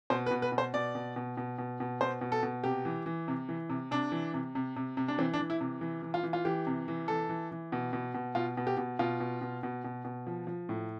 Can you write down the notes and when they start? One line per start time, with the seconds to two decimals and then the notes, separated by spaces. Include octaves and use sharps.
0.10 B2 C5
0.26 B4
0.31 B2
0.42 B4
0.52 B2
0.58 C5
0.74 B2 D5
0.95 B2
1.16 B2
1.37 B2
1.58 B2
1.80 B2
2.01 B2 C5
2.21 B2
2.32 A4
2.43 B2
2.64 C3 G4
2.85 E3
3.06 E3
3.28 C3
3.49 E3
3.69 C3
3.91 C3 D4
4.12 E3
4.34 C3
4.55 C3
4.76 C3
4.97 C3
5.08 D4
5.18 E3 C4
5.34 D4
5.39 E3
5.50 E4
5.61 C3
5.81 E3
6.03 E3
6.14 F4
6.23 E3
6.33 F4
6.45 E3 G4
6.67 C3
6.88 E3
7.08 E3 A4
7.29 E3
7.51 E3
7.72 B2
7.93 B2
8.14 B2
8.35 B2 F4
8.57 B2
8.67 G4
8.77 B2
8.99 B2 F4
9.20 B2
9.41 B2
9.63 B2
9.84 B2
10.05 B2
10.27 F3
10.47 F3
10.69 A2